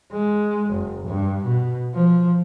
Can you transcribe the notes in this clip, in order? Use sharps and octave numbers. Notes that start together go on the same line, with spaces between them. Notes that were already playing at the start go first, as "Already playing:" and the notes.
G#3
F#1
G2
B2
F3